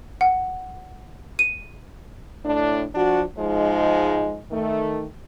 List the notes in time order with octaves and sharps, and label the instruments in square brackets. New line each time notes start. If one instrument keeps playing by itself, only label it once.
[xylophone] F#5
D#7
[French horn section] A2 D4
F3 D4 F#4
G#2 F3 G#3 D#4
D#3 A3